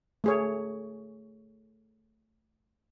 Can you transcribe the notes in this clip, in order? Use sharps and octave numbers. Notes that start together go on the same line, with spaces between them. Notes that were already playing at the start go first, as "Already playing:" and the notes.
A3 G#4 C#5